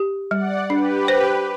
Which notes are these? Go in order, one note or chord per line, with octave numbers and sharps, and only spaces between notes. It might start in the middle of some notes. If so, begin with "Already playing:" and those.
Already playing: G4
G3 D5 F#5
D4 G4 B4
C5